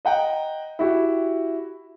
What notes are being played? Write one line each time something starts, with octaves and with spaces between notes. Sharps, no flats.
D#5 F#5 G5 A#5
E4 F#4 G4